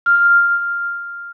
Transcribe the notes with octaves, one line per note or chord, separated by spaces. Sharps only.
F6